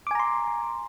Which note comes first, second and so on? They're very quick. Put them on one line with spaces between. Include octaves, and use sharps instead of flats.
D6 G#5 A#5 C6